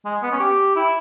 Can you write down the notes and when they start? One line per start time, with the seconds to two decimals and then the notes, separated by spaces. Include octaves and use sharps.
0.05 G#3
0.23 B3
0.32 C#4
0.40 G4
0.76 E4